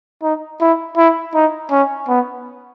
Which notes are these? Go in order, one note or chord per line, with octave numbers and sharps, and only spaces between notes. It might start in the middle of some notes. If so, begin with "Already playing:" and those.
D#4
E4
E4
D#4
C#4
B3